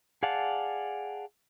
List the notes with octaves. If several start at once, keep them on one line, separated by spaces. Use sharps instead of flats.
G#4 D5 F5 F#5 A5